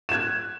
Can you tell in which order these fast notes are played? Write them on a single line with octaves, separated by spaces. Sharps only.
E7 G#6 F#6